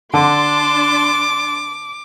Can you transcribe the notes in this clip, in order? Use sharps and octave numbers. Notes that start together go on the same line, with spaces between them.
D3 D4 A5 C6 D6